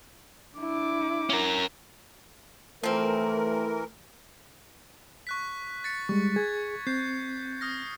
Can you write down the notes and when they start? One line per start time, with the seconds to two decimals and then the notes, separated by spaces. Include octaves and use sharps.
0.57 D4 E4 D6
1.30 C#4 A#4
2.83 E3 F3 A3 C4 A#4
5.27 C#6 F#6 B6
5.84 A6 B6 C#7
6.09 G3 G#3 C#6
6.36 G#4 G#6
6.87 C4 G6 C7
7.61 D#6 F6 A#6